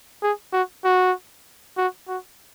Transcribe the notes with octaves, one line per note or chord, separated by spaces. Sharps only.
G#4
F#4
F#4
F#4
F#4